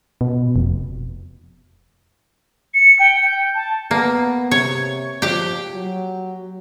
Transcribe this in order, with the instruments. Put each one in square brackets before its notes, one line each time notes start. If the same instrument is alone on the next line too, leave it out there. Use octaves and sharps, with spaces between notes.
[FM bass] B2
F1
[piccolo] C#7
G5
G6
A5
[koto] A#3 [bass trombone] B3
[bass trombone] C3 [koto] C#5
[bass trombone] F3 [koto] G4 G5
[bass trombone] F#3